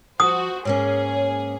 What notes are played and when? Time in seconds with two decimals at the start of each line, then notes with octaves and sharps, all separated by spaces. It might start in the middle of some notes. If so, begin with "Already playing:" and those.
0.20 F3 F#4 C5 D#6
0.65 G#2 A#3 C#4 G#4 C#5